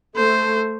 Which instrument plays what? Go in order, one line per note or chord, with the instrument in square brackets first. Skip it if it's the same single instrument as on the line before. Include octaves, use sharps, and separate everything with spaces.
[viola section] A3 [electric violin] C5